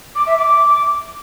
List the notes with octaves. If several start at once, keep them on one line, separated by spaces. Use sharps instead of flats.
D6
E5
D6